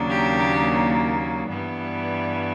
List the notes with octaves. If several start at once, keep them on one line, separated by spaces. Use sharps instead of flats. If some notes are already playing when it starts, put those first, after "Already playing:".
Already playing: D#2 C#3 F#3 A#3 D4
G4
G2 E3 G3 B3